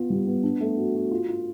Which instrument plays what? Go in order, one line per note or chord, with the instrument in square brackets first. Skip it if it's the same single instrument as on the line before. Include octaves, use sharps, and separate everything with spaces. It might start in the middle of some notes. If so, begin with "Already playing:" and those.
Already playing: [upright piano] B3 F4
G3
B3
D4
A3
F#4
F#4
F4
F4